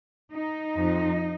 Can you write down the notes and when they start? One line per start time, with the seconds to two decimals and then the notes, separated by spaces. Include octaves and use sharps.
0.31 D#4
0.76 F2 F3